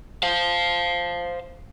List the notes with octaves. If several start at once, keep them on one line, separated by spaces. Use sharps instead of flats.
C5 F5